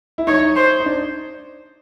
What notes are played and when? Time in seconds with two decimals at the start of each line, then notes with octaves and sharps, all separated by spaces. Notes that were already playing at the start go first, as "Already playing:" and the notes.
0.18 E4
0.27 D#4 C#5
0.56 C5
0.80 D#4
0.86 D4